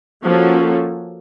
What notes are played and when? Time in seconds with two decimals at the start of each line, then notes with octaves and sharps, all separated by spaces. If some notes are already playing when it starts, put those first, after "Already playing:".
0.23 F3 A#3 C#4 F#4 A4